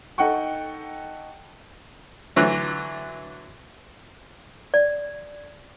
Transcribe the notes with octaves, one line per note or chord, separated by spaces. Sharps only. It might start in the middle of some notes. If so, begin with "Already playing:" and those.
D#4 A4 F#5 G5 C#6
D3 E3 F#3 A3
D5